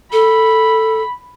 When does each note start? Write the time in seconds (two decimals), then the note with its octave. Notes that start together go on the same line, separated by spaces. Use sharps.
0.12 A4 B5